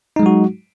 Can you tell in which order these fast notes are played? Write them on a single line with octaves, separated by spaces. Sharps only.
D#4 G#3 F#3 F#4